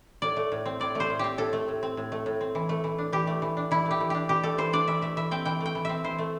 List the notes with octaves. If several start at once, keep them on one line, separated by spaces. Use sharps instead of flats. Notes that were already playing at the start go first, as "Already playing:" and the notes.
A2 D5
A3
A2
C4
A2 D5
A3 C5
A2
C4 G4
A2 A4
A3
A2
C4
A2
A3
A2
C4
E3
A3
E3
D4
E3 G4
A3
E3
D4
E3 E4
A3
G4
E3
D4 G4
E3 G4
A3 A4
E3 C5
D4 D5
E3 E5
A3 E5
E3 E5
C4 G5
E3 G5
A3
G5
E3
C4 E5
E3 C5
A3